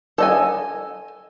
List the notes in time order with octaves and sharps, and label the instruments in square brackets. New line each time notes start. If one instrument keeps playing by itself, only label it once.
[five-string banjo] A4 D#5 G#5